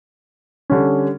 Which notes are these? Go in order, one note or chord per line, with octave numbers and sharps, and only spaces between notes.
D3 G3 C#4